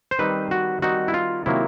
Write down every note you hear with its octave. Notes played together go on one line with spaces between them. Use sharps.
C5
D#3 G3 C4 D#4 B4
F#4
D#3 G3 C4 D#4 F#4
E4
F4
C3 D#3 F#3 A#3 E4